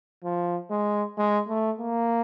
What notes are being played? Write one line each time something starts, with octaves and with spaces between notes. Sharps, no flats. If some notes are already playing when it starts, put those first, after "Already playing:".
F3
G#3
G#3
A3
A#3